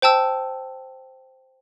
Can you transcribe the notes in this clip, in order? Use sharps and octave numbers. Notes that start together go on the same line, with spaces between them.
C5 G5 A5 E6